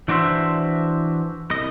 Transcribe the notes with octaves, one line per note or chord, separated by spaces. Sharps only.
E3 D4 F#4 C5 E5
C2 D#5